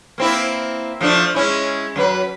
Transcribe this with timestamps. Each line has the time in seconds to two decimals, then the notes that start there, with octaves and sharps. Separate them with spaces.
0.18 A#3 C4 E4
1.01 F3 A3 D4
1.35 G#3 C#4 E4
1.96 F#2 F#3 B4